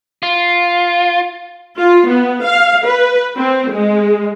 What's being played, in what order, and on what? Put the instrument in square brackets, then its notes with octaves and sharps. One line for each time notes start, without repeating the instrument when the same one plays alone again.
[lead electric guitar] F4
[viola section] F4
B3
F5
B4
C4
G#3